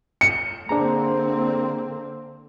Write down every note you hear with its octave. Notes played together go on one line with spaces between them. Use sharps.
C#7
D3 A#3 C4 D4 G#4 A#5